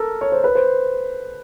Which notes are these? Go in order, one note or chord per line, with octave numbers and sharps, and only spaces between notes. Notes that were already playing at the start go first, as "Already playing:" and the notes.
Already playing: A4 A#4
C#5
C5
B4
C5